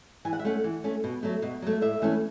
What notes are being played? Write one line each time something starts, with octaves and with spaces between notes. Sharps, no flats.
E3 G#5
F#5
E5
A3 C#4 F#5
E3
A3 C#4
B2
F#3 A3
B2
F#3 A3
A2 E5
E3 A3 C#4